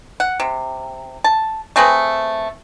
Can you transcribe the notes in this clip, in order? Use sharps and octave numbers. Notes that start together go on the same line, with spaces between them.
F#5
C3
A5
A3 C4 G#4 B4